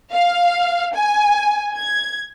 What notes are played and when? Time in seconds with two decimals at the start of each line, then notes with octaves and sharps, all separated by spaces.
0.13 F5
0.95 G#5
1.75 G#6